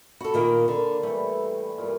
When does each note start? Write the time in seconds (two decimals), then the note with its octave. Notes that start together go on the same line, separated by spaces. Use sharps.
0.21 F#4 A4 B5 C#6
0.34 A#2 D#3 A#3
0.68 D3 A#3 D4
1.03 A2 E3 G3 C#6
1.78 G2 A#2